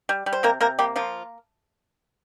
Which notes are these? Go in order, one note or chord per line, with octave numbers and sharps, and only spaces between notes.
G3
G3
C5
C3 A#3 A#4
C3 A#3 A#4
G3 A#3 G4
F3 A#3 F4